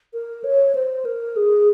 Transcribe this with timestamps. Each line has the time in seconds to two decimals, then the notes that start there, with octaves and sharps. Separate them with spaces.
0.14 A#4
0.44 C#5
0.75 C5
1.05 A#4
1.36 G#4